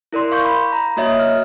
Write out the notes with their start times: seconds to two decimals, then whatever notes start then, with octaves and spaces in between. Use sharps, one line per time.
0.13 E4 A#4 D5 C6
0.32 F5 C#6 G6
0.45 B5
0.72 A#5
0.97 A#3 F#4 C#5 D#5 E5
1.19 F6